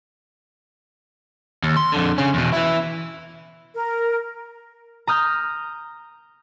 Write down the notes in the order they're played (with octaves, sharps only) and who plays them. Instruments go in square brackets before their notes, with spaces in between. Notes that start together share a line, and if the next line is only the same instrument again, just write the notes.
[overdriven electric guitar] D#2
C6
F2 D3
C#3 C#4
E2 B2
E3 E4
[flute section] A#4
[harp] A#5 D#6 F6 G6